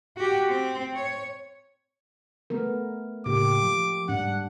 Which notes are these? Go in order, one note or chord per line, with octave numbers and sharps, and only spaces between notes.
F#4 G4
C4
C#5
A3 B3 A#4
A2 C#3 A#3 G4 D6
F3
G#2 G3 D4 F#5